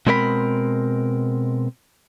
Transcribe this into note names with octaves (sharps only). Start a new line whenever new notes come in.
B2 G#3 C4 A#4 C5 B5